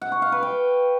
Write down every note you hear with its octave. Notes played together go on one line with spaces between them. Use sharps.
F#5
C#6
F5
B4
G5